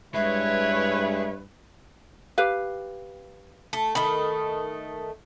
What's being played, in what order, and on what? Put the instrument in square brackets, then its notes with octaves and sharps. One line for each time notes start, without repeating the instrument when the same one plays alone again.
[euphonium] G2 [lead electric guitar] G#3 [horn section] E4 B4 C#5 [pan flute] E5
[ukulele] G4 B4 F5
[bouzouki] A3
[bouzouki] D#3 A3 [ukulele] B5